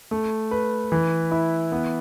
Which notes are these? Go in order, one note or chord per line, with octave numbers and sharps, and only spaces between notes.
A3
B4
E3
E4
B3